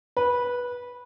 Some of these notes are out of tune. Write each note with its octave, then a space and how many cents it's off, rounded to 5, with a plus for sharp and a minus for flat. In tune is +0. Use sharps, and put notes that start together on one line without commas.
B4 -15